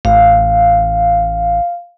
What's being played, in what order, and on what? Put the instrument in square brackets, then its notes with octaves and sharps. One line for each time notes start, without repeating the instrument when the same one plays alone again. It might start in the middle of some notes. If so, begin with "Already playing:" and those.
[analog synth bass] A1 [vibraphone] F5